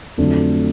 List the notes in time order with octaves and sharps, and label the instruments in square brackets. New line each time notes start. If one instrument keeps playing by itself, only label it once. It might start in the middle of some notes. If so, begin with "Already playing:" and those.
[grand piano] F2 D3 F#3 A3 D4